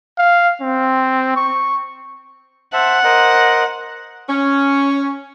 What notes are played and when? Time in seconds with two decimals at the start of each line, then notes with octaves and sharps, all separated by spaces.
0.18 F5
0.61 C4
1.36 C#6
2.73 C5 E5 F#5 A5
3.04 A#4 C5 D#5
4.29 C#4